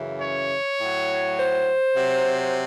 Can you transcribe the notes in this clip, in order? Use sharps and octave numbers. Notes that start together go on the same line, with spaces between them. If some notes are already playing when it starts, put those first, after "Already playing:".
Already playing: F#2 C#3 E3
C#5
A2 F#3
C5
C3 F#3